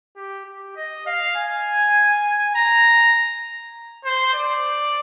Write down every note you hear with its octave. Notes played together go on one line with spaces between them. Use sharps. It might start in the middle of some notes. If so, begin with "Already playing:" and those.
G4
G4
D#5
F5
G#5
A#5
C5
D5